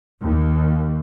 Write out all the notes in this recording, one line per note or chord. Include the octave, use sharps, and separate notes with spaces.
D#2